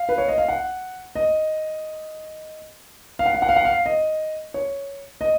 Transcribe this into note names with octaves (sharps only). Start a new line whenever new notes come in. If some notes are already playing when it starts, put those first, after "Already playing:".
Already playing: F5
B4
C#5
D#5
F5
F#5
D#5
F5
F#5
F5
F#5
F5
F#5
F5
D#5
C#5
D#5